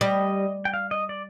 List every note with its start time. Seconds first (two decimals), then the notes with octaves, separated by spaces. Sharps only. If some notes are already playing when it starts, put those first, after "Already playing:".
0.01 G3 D#5
0.65 G5
0.74 F5
0.91 D#5
1.09 D5